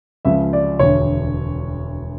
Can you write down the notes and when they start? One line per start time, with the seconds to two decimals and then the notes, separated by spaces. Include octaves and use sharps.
0.25 C#2 C#3 F3 E5
0.53 D5
0.79 E1 D2 D3 C#5